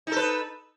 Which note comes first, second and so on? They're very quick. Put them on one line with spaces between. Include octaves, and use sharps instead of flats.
D#4 A4 B4